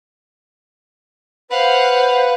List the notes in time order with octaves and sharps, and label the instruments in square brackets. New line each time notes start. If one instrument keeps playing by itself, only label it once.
[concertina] B4 [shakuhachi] C5 [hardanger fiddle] F5 F#5